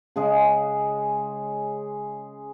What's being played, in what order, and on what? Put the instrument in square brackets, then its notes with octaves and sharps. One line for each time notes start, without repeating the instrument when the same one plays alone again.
[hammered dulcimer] C#3 G#3 G#4